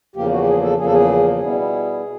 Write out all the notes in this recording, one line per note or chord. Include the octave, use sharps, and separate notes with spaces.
E2 C#3 F3 A#3 G4
F#4
G4
G#4
A4
E2 C#3 F3 A#3 G#4
A4
G#4
B2 G3 B3 E4 G#4
B2